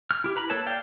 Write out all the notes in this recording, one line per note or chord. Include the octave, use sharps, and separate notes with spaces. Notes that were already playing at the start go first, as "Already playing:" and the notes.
F6
E4 G4
B4 A#5 B5
A#3 A4 B4 C#5 A5
D5 F5 G5